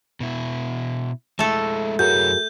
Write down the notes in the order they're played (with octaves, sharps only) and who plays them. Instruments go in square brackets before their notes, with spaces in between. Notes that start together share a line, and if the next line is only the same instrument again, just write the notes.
[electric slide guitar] B2 E4
[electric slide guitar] G#3 E4 [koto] A3 A4
[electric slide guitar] F#2 E4 C#5 [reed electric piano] F#4 G#4 A#4 [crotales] G6